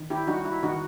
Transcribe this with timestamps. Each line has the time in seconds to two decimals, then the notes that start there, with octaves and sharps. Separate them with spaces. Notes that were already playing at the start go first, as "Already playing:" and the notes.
Already playing: D#3
0.10 E4 G4
0.27 G3 D#4 F#4
0.45 E4
0.63 D#3 D#4 F#4